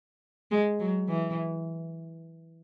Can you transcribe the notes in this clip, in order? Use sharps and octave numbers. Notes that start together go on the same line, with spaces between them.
G#3
F#3
E3